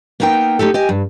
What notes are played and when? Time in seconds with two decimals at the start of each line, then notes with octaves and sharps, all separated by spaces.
0.20 A#3 B3 D#4 A#4 G5
0.59 A3 D#4 G4 A4
0.74 G4 D#5 G#5
0.89 G2